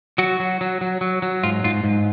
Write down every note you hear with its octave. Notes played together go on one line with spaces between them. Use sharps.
F#3 F#4
F#3
F#3
F#3
F#3
F#3
G#2 F4
G#2 F4
G#2